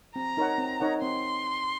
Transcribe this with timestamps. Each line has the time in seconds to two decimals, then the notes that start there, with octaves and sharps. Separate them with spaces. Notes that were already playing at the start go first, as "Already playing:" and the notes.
0.15 C4 A#5
0.37 D#4 A#4 C#5 F#5
0.58 C4
0.80 D#4 A#4 C#5 F#5
1.02 C4 C6